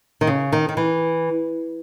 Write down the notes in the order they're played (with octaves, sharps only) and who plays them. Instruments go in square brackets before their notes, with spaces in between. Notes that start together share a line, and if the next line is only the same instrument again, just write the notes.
[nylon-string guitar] D#3
C#3
D#3
D#3
E3